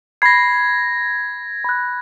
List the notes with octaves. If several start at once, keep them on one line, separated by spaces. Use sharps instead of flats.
B5 G#6 A#6 C7
B5 F#6